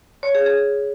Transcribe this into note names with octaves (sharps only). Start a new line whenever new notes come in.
C#5
G#4
G#4